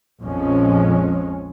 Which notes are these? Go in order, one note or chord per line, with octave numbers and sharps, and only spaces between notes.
A#1 F2 F3 G#3 C#4